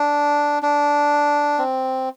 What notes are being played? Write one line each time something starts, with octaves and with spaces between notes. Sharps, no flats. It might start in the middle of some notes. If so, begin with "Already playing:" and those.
Already playing: D4
D4
C4